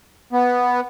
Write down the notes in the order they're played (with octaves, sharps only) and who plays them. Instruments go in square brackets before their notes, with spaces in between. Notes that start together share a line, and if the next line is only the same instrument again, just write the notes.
[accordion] B3